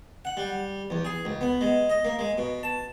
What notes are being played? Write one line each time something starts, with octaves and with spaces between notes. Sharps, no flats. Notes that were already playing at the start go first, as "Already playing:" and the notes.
F#5
G3
E2
G#4
C#2
B3
G#3
D#5
A#3
G#3
B2
A5